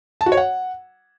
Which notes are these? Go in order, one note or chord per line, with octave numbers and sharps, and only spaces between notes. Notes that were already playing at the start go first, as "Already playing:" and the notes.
A5
F#4
C#5
F#5